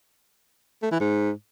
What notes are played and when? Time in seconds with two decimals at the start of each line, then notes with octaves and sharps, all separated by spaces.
0.82 A3
0.91 E3
1.00 G#2